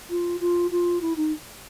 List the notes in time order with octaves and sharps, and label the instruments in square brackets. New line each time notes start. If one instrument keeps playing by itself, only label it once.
[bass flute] F4
F4
F4
E4
D#4